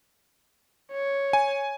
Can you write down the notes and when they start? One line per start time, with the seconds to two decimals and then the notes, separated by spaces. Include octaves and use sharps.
0.93 C#5
1.33 G#5